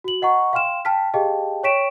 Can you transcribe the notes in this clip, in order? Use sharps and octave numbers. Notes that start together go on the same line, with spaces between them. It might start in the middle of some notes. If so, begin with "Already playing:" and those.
F#4 F#7
D#5 F#5 A#5 C#6
F5 G5 C6 F6 E7
G5 A5 F6 B6
G4 G#4 D#5 F5 G5 A5
C#5 G5 C#6 B6 D7 E7